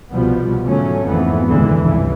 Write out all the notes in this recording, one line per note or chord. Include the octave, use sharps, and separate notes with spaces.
C2 B2 F3 G3 B3
G#2 D3 F#3 A3 C#4
G#1 F2 E3 B3
F1 D#2 D3 E3 G#3
F1 C#2 G2 E3